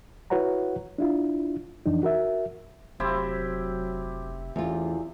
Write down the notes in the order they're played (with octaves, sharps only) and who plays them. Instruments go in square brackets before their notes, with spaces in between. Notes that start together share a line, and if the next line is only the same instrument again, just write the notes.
[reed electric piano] E4 F#4 B4 C#5 F#5 A#5
D4 E4 F4
F2 E3 D4 D#4
F#4 A#4 E5
[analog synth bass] F1 [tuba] F#3 [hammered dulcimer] C4 E4 G4
[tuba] A1 [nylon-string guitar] E2 F4 [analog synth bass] E3